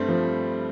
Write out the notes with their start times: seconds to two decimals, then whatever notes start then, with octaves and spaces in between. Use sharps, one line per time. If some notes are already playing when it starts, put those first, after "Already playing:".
Already playing: G2 G3 A3 C4
0.09 F3